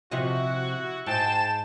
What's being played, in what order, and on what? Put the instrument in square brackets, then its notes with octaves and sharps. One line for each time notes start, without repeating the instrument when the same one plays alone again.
[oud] C3 F3 D#5 [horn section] E4 F#4
[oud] G#2 [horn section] C5 G5 [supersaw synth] A5 E7